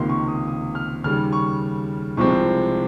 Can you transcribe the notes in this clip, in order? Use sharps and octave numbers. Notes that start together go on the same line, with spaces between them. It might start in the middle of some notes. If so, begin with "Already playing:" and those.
Already playing: C#2 C3 D#3 A#3 C6
C#6
D#6
D#6
F6
D#2 C#3 G3 F6
C#6
C2 C3 F3 G#3 C4 C#6